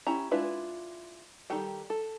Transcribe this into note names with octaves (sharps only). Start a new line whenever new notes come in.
C#4 E4 G4 A#5
G#3 D4 E4 F4 B4
D#3 G3 G4 A4 G5
A4